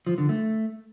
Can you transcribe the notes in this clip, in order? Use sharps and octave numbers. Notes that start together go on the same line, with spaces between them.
F3
D3
A3